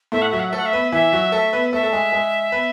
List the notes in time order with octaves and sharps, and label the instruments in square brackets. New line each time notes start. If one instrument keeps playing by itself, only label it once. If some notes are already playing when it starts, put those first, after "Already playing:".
[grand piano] A2 A3 [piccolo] E5
[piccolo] F#5
[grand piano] F#3 F#4 [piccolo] E5
[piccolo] F#5
E5
[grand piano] A3 A4 [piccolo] F#5
[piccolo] E5
[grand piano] B3 B4
[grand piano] E3 E4 [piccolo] E5
[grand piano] F#3 F#4
A3 A4
B3 B4
[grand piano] A3 A4 [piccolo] E5
[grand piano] A4
G#3 G#4
G#3 G#4
B3 B4